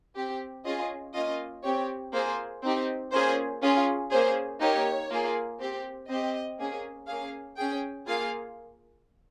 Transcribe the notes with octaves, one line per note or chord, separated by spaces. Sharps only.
C4 G4
C#4 F4 G#4 D#5
A#3 C#4 F4 D#5
C4 G4 C#5
A#3 F4 G#4 C5
C4 D#4 G4
A#3 C#4 F4 G#4 C5
C#4 F4 G#4
A#3 C#4 G#4 C5
A#3 D#4 G4 C#5
A#3 F4 G#4
C4 G4
C4 G4 D#5
A#3 C#4 G#4
A#3 C#4 G#4 F5
C#4 G#4 G5
A#3 F4 G#4 F5